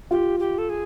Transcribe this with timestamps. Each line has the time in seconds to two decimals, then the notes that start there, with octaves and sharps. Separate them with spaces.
0.11 F4 G4
0.40 G4
0.58 A4
0.70 G#4